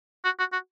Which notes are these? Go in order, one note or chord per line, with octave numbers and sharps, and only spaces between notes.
F#4
F#4
F#4